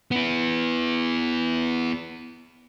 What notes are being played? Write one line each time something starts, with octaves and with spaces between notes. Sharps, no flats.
B3 E4